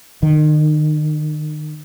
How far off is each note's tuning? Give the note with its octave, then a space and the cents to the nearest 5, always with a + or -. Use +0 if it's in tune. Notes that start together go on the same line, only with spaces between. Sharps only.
D#3 -35